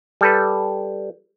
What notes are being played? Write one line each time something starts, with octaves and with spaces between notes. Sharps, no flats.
G3 A4 B4